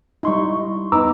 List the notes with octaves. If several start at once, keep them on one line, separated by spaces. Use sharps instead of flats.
G3 D#4 E4 C6 C#6
B3 D#4 B4 A#5 D6 E6